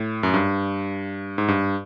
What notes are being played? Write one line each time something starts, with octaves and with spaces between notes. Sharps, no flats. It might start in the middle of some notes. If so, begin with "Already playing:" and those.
Already playing: A2
F#2
G2
G#2
G2